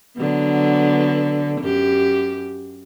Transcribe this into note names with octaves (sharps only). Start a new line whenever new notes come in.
D3 F#3 B3
F#2 G4